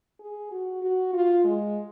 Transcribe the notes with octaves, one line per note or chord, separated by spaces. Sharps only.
G#4
F#4
F#4
F4
G#3